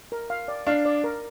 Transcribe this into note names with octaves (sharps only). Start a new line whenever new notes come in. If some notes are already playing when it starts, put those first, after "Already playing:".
A#4
F5
D5
D4 F5
D5
A#4